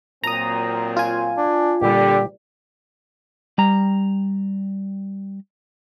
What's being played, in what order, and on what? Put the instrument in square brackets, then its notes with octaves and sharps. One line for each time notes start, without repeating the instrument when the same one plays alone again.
[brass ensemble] A#2 F#3 C4 [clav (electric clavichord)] A5 [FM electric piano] A#5 D#6
[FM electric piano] F4 G#5
[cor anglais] D4
[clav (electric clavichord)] A#2 G3 [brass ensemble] D3 [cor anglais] G4
[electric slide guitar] G3 A#5